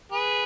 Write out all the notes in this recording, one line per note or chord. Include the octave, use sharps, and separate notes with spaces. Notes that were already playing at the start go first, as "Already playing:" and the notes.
G#4 B4